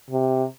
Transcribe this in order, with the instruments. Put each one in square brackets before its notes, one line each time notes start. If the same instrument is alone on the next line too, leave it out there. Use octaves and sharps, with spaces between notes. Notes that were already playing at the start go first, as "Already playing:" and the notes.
[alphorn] C3